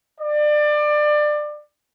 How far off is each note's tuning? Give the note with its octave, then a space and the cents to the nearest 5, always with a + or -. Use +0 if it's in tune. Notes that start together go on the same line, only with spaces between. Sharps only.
D5 +25